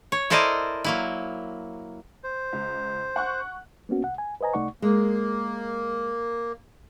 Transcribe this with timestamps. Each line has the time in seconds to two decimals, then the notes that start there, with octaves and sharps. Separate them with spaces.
0.12 C#5
0.30 E4 A4 A#4 C5 D5 D#5
0.84 F#3 A#3 E4
2.23 C5
2.53 C#2
3.16 F#5 C#6 F#6
3.89 A#3 B3 C#4 F#4
4.03 C2 F#5
4.18 G#5
4.41 B4 C5 D#5 G#5 A#5
4.53 C2 A3 D#4 D5 F#5 C#6
4.82 G#3 A#3